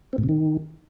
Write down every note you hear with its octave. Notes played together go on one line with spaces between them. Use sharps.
C4
A2
C3
D#3